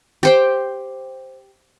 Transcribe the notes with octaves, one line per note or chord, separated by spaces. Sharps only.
G4 C5 G5